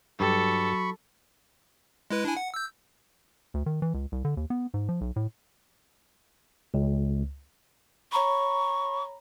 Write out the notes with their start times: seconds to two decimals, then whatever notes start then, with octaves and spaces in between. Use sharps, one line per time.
0.20 G2 F#3 G4 A4 B5 C#6
2.10 G#3 E4 B4
2.25 D4 E4 G#5
2.37 F#5
2.54 E6 G6
3.54 D2
3.66 D#3
3.82 E3
3.94 C#2
4.12 C2
4.25 D3
4.37 D#2
4.50 B3
4.74 G#2
4.89 F3
5.01 B1
5.16 A2
6.74 C#2
8.12 C#5 A#5 B5 C#6